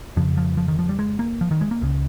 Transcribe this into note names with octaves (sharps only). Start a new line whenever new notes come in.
F2 C#3 F3
F3
F3
D#3
F3
G3
G#3
A#3
F3
D#3
G#3
A#3
C#2 C#3